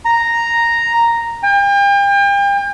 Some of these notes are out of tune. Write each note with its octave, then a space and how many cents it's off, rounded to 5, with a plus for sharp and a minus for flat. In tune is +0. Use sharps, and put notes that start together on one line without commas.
A#5 -5
G5 +40